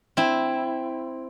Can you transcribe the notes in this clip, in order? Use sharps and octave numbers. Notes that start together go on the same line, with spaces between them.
C4 E4